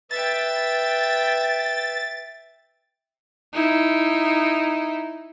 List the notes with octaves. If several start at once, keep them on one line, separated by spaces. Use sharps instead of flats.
B4 E5 G5 A6
D#4 E4